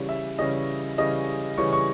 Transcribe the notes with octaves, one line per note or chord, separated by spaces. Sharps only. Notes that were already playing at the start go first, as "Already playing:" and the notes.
Already playing: C#3 E3 G3 C#4
E5
C#3 E3 G3 C#4 D#5
C#3 E3 G3 C#4 D#5
C#3 E3 G3 C#4 C#6
C#6